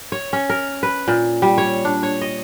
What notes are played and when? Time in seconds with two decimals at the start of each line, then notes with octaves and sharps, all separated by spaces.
0.12 C#5
0.33 C#4
0.49 A#4
0.83 B4
1.08 A#2
1.42 G3
1.58 C#5
1.85 D4
2.03 C#5
2.21 D#5